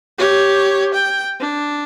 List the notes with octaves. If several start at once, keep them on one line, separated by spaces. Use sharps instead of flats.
G4 C#5
G5
D4